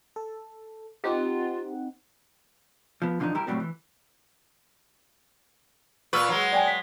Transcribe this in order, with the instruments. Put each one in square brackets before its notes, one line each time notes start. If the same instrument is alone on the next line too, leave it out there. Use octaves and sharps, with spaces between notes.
[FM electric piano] A4
[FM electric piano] C4 D#4 F#5 [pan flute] F4 [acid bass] G4
[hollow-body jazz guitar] F3 B3
E2 D3 F3 A3 D4 D#4
G3 E4 G4 A#4
C#2 A2 C3 F#3 G3 C4
E3
[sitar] A#2 B4 [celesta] C#6 E6 F6
[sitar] F#3 G#3
[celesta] D5 G5 G#5
B6